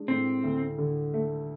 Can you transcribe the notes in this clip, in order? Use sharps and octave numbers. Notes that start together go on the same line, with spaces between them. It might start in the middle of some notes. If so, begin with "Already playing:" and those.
Already playing: G#3 D4
A2 C4
D2
D3
A3